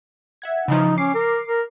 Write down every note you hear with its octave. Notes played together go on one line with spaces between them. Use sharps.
E5 F#5 G#6
C#3 E3 F3 D#4
C#4 D6 C7
A#4
A#4